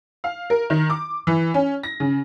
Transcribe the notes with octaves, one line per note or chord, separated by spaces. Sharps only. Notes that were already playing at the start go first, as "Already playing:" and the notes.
F5
A#4
D#3
D6
E3
C#4
A#6
C#3